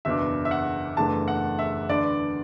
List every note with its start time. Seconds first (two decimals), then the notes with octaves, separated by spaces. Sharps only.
0.05 F#1 E2 B2 B3 D4 E5
0.45 E5
0.51 F#5
0.97 F#1 E2 E3 A3 D4 A5
1.28 F#5
1.59 E5
1.89 E2 D3 B3 D4 D5